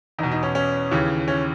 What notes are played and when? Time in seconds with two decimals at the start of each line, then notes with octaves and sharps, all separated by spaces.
0.19 E2 B2 D#4
0.32 D#4
0.43 C#4
0.55 C#4
0.91 D#2 C#3 E3
1.28 C#4